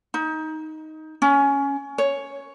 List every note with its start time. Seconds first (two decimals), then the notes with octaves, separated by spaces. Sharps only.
0.14 D#4
1.22 C#4
1.98 C#5